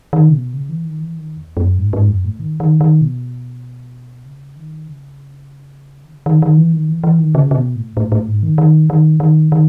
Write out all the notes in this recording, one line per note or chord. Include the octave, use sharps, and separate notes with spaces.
D#3
C#3
B2
C#3
E3
D#3
E3
D#3
E2
F#2
G#2
G#2
F#2
A2
D#3
D#3
D#3
B2
C#3
D#3
C#3
D#3
C#3
D#3
D#3
E3
D#3
E3
E3
D#3
C#3
C#3
B2
A2
A2
A2
G#2
D#3
D#3
D#3
D#3
D#3